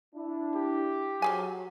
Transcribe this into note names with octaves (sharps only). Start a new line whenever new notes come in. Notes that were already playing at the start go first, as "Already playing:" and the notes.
D4 E4
G4
F3 F#3 G#4 G#5